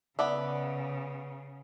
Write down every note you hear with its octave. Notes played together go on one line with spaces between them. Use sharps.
C#3 B3 D5 E5